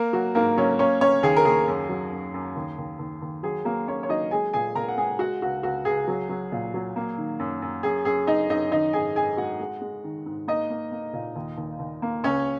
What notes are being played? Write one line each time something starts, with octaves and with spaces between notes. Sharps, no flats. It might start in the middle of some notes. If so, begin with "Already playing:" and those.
Already playing: A#3 A#4
F#3 F#4
G#2 A#3 A#4
F#3 C#4 C#5
A#3 C#4 C#5
A#3 C#4 C#5
D#2 G#4
A#4
D#2 G#4
F#2
F#3
F#2
F#2
D#2
D#2
D#2
D#2
F#3 G#4
F#3 A#3 A#4
A#3 C#4 C#5
C#5
F#3 D#4 D#5
G#3 G#4 G#5
A#2 G#4 G#5
A#2 A#4 A#5
F#5
G#3 G#4 G#5
G#3 F#4 F#5
C#2 F#4
C#2 F#4
C#2 G#4
F#3
F#3
A#2
F#3
A#3
D#3
F#2
F#2
F#2 G#4
F#2 G#4
F#2 D#4 D#5
F#2 D#4 D#5
D#3 D#4 D#5
G#2 G#4 G#5
G#2 G#4 G#5
G#3 F#4 F#5
G#3
G#3
D#3
G#2
A#3 D#4 D#5
A#3
A#3
A#2
D#2
D#2
D#2
A#3
C#2 C#4 C#5